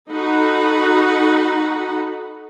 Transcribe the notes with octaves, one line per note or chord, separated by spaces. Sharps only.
D#4 F#4 A4 F#5 B5